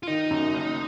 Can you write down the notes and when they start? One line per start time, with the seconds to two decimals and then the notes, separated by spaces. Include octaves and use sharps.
0.03 F4
0.07 D#3 D#4
0.31 F#2
0.54 F#1